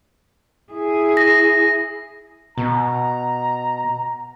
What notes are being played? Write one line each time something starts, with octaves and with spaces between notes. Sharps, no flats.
E4 G#4
A#6
B2 A#5